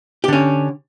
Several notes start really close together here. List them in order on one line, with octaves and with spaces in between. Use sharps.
G4 D3 C#4